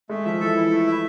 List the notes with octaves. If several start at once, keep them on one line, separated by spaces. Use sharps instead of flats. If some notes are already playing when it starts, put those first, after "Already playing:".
G#3 A3
F3 E5
E3 A4
E3 E4
A3
E5